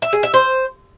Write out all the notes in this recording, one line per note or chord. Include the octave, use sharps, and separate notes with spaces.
E5
G#4
E5
C5